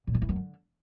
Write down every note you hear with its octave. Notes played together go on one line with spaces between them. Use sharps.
A#2
D#3
E3
F#2
D3